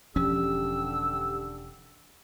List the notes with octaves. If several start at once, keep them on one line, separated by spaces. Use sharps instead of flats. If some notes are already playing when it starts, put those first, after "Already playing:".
E1 D3 F3 C#4 D4 G4 E6